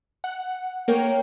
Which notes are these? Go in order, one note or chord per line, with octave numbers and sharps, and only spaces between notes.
F#5
A#3 A#4 C#5 G5